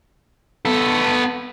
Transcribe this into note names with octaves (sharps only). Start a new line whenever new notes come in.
B3 A4